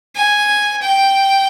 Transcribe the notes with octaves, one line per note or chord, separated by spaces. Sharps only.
G#5
G5